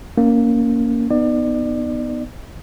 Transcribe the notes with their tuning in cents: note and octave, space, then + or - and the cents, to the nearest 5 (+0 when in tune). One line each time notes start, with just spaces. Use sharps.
A#3 +0 C#4 +20
B3 +0 D#4 -15 D5 +30